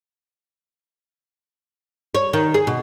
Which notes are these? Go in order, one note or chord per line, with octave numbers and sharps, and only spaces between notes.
C#5
D#3
G#4
B2